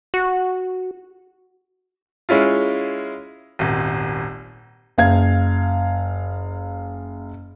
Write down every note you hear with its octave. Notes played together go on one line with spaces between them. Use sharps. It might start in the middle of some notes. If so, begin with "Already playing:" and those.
F#4
G#3 C#4 E4 F4
D#1 G#1
F#1 F5 G#6